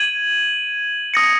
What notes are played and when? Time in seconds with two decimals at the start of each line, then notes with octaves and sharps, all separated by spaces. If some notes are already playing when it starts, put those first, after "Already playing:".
Already playing: G#6 D#7 F#7
1.14 D#6 A#6 C#7